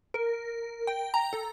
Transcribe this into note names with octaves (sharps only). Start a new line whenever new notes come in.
A#4
G5
A#5
A4